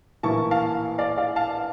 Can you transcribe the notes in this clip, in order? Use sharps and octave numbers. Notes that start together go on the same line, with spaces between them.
A#1 A2 E3 A#3 E4 A5 C#6
F5 A5
D5 F5
D5 F5
F5 A5